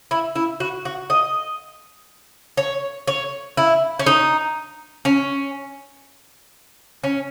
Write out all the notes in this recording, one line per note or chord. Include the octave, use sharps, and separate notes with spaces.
E4
E4
F#4
F#4
D#5
C#5
C#5
E4
C#4
D#4
C#4
C#4